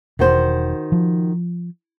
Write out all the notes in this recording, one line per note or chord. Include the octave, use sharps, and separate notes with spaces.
E1 D#3 F#4 C5
F3